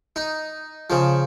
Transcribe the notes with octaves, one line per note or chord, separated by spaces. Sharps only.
D#4
C#3 F3